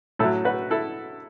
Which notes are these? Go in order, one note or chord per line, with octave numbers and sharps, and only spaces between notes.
A2 F#3 E4 A4
F#4 B4
E4 A4